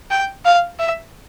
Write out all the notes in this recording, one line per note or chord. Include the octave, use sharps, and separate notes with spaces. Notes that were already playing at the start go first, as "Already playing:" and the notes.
G5
F5
E5